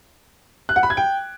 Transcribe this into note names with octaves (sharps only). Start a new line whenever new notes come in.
F#6
F#5
B5
G#6
G5